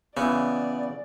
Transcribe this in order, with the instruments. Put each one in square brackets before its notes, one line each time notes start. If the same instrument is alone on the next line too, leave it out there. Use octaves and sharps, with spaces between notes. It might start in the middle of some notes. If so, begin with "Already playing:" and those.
[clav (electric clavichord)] C#3 E3 [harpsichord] B3 F#4 [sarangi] D5